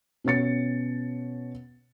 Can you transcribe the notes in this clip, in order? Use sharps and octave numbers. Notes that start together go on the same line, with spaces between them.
B2 C#4 C#5 A6 C#7